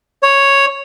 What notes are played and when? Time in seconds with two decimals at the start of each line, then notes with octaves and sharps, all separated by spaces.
0.23 C#5